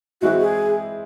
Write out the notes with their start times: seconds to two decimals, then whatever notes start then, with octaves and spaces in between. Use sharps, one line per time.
0.21 E3 G#3 C4 E4 F#4
0.41 G#4